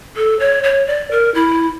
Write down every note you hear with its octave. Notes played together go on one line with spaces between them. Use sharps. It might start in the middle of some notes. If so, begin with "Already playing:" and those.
A4
C#5
C#5
D5
A#4
E4